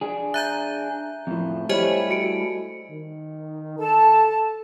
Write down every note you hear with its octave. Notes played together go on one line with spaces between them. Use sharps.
D4 G#4
E5 A#5 F#6 G6
F2 A2
G3 A3 E4 G4 C5 C#5 D#5 G#5
F#4 C#7 D7
D#3
A4 A5